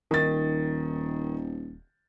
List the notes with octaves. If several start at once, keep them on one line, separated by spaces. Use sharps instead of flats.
D#1 D#3 A6